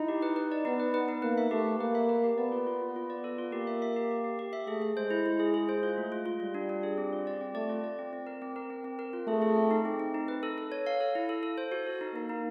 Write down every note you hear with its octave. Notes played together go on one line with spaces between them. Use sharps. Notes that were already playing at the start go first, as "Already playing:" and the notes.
Already playing: D#4 E4
G4
B4
B4
D5
B3 D#4
B4
B4
D#4
A#3 B4
E5
A3 G4
G4
A#3 B4
E5
B4
G4
B3 D5
F4
F4
F4
F4
D5
A4
F4
A#3 G4
E5
E5
G4
G4
G4
G4
E5
A3 G#4
G#4
G#3 C5
E4
E4
G#4
G#4
C5
F4
A3
F4
F4
G3 F4
D4
D4
G#4
C4
F4
D5
C4
A3 D5
F4
D5
C4
C4
A#4
C4
A#4
C4
C4
A#4
F4
A3 G#4
G#4
C4
D#4
C4
C4
D#4
B4
A4
A4
C#5
F5
A4
E4
A4
A4
C5
F#4
A4
D#4
A#3 D#4
D#4